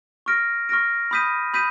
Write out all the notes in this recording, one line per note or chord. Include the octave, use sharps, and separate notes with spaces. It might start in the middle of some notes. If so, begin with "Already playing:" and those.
C#6 F6 A#6 D7
C#6 F6 A#6 D7
B5 D#6 G6 B6 D#7
B5 D#6 G6 B6 D#7